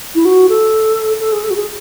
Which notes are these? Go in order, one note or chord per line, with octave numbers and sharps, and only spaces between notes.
E4
F#4
A4
A4
G#4
A4
F#4
G#4